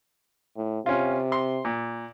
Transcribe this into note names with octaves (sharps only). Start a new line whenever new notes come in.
A2
C3 C#4 F4
C6
A#2